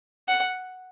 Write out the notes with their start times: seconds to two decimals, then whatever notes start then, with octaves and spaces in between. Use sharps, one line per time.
0.28 F#5